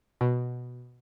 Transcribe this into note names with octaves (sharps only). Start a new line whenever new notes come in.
B2